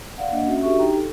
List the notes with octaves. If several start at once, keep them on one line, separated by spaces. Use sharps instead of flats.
D5 F5 F#5
A#3 D4 D#5 F#5
C#4 F#4 E5
D4 F#4 G4 A4 E5 C#6
D#4 G4 G5 A#5
A4